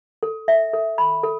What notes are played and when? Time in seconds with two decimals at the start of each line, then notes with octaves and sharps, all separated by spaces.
0.23 A4
0.48 E5
0.73 A4
0.98 B5
1.23 A4